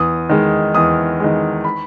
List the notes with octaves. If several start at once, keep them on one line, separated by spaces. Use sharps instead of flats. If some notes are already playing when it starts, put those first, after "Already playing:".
Already playing: E2 D#6
D#3 G#3
E2 D#6
D#3 G#3
B5